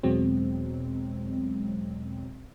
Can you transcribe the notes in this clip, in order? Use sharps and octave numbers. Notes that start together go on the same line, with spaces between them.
E2 B2 F#3 G#3 C4